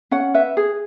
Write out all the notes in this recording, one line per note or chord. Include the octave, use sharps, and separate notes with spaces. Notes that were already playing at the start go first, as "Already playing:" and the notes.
C#4 F#5
B4 E5
G#4